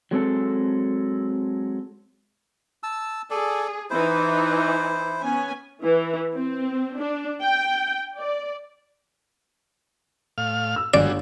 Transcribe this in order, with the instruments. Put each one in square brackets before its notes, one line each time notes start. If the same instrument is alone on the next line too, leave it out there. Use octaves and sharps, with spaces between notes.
[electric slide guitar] F#3 G#3 C4 A4
[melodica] A5 E6
[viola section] G#4 [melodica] A4 D5
[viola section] E3 D#4 [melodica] E4 C5
[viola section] B3 C#4 G#5
E3
C4
D4
G5
D5
[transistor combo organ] A2 F5 F6
[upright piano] E6
[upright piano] G1 [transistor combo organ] G3 G#3 F#4 [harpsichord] D5